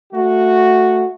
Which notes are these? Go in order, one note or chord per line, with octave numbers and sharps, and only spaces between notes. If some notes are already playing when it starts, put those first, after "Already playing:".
A3 F#4